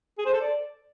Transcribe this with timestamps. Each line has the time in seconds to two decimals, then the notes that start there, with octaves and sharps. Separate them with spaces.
0.18 G#4
0.26 C5
0.33 A4
0.41 D5